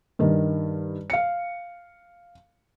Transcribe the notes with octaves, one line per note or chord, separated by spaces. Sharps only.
G2 D#3
F5 C#7